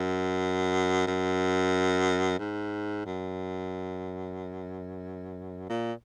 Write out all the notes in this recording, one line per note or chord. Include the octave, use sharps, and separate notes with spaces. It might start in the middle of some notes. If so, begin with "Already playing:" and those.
Already playing: F#2
F#2
G#2
F#2
A#2